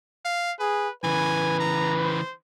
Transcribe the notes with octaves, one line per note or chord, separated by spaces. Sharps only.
F5
G#4 B4
C#3 E3 B4 G#5
A#5
C5